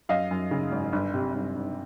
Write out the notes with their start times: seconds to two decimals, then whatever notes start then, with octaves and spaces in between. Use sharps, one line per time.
0.09 F#2 D#5 F5
0.31 F#2
0.51 C#3
0.71 G#1
0.92 G1
1.14 C3
1.35 G1
1.56 G1